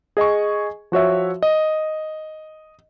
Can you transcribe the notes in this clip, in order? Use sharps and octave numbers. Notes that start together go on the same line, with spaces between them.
G#4 D#5 G#5 C#6
F3 F#4 C#5 E5
D#5